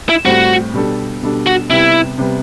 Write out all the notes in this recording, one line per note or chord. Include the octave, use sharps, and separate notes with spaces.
E4
A2 G3 C4 F#4
B2 G3 D4 A4
B2 G3 D4 A4
F#4
C3 G3 B3 E4
C3 G3 B3